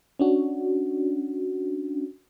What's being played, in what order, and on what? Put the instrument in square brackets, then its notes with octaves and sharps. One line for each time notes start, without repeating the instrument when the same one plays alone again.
[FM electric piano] C#4 D4 F#4